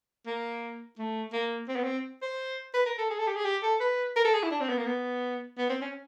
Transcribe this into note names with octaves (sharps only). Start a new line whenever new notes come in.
A#3
A3
A#3
C4
B3
C4
C5
B4
A#4
A4
G#4
A4
G4
G#4
G4
A4
B4
A#4
A4
G#4
E4
D4
C4
B3
A#3
B3
B3
C4
C#4